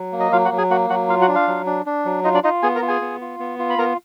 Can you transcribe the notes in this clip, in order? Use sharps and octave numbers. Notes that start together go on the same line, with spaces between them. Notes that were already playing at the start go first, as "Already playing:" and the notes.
Already playing: F#3
A#3
D#5
F#3 F4 F5
F#4 F#5
F#3
G#4 G#5
A#3 F#4 F#5
F#3 F#4 F#5
F4 F5
F#4 F#5
D4
F4 F5
F#3
D4
D4
F#3
D#4 F4 D#5
D4 D5
D#4 F4 D#5
B3 G#4 G#5
A#4 A#5
F4
G#4 G#5
B3
F4
B3
F4
B5
B3 A#4 A#5